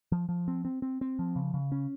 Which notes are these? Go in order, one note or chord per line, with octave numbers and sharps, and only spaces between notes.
F3
F3
C4
C4
C4
C4
F3
C#3
C#3
C#4